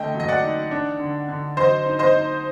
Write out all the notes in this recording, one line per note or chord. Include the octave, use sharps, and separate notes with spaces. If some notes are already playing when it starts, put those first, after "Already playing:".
Already playing: D3 A3 D#5 G5
F#3
D#5
D5 F#5
D#4
D4
D3
D3
F#3 C5 D#5
D#4
C5 D#5
D#4